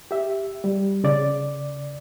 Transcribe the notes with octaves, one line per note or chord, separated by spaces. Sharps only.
G4 E5
G3
C#3 D5